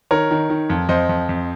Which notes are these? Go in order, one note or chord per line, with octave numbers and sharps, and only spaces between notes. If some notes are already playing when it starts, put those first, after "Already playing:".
D#3 A#4 C#5
D#3
D#3
F2
F2 C5 D#5
F2
F2